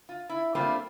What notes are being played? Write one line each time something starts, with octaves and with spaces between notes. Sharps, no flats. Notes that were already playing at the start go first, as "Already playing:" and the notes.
F4
E4
G3 A3 A#3 C4 D4 F4